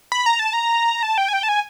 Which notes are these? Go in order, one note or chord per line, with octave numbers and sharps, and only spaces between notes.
B5
A#5
A5
A#5
A5
G5
G#5
G5
A5
G#5